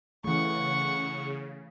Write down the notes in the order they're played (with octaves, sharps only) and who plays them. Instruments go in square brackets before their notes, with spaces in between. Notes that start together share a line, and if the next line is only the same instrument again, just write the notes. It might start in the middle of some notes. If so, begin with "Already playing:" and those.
[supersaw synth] C#3 [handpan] E3 A3 [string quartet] F#5 C#6